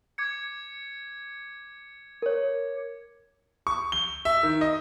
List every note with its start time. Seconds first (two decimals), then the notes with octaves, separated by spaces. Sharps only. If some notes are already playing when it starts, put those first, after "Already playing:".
0.18 D6 G#6 C#7
2.22 A#4 C#5
3.67 C#6
3.92 G7
4.25 E5
4.43 D#3
4.61 D#5